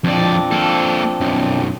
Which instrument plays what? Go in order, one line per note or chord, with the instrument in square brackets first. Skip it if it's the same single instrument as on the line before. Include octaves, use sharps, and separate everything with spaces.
[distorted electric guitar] F2 D5 [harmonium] F3 C4 D4
[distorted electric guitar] A#3 A4
B1 F#2